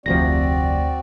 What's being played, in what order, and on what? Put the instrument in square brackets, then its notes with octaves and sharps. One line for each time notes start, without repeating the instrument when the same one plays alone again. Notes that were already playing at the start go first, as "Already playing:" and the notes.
[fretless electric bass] F1 C3 F3 [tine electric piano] D2 A#6 [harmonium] C4 F#4 D5